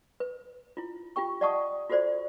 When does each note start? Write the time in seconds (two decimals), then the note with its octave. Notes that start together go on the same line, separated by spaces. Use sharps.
0.20 B4
0.77 E4 F4
1.16 F4 G4 G5 C#6
1.41 D5 D#5 F#5 A5 C#6 D#6
1.90 F4 F#4 A4 C5 D5